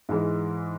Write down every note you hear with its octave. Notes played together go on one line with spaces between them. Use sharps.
G#2 E3 G#3